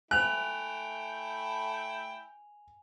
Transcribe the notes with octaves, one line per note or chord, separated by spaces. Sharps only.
A3 E4 G5 G#5 F#6 F7